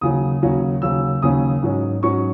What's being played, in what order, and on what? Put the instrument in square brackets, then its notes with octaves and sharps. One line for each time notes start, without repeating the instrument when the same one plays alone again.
[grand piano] D#2 C#3 F#3 C#4 D#6
D#2 C#3 F#3 C#4
D#2 C#3 F#3 C#4 E6
D#2 C#3 F#3 C#4 D#6
G#2 F#3 C#4
G#2 F#3 C#4 C#6